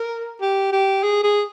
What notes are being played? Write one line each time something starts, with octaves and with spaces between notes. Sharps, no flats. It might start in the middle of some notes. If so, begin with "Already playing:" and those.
Already playing: A#4
G4
G4
G#4
G#4